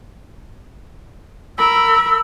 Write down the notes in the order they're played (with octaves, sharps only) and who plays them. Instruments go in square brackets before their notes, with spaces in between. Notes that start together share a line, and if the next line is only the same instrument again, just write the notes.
[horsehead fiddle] A#4 B5 [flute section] E6